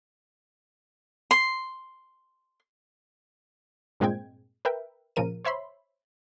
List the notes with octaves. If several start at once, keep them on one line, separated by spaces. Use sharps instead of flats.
C6
G2 A#2 G#3 C4 G5 G#6
A#4 B4 E5 G5
A#2 C#3 F3 A#4 D#7
C5 C#5 E5 B5 C6